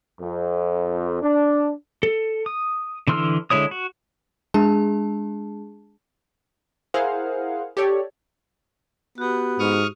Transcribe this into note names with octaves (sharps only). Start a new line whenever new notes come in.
F2
D4
A4
D#6
D3 E3 C6 E6 F6
D3 G#3 E4 C#5 D#6
F#4
G#3 D4 G#4 A5
E4 G#4 A#4 C5 F5 F#5
G4 A4 C#5 D5
B3 F#4 G4
G#2 C#6 D#6 F6